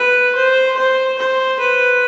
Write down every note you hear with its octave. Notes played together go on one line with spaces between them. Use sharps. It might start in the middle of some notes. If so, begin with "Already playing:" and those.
Already playing: B4
C5
C5
C5
B4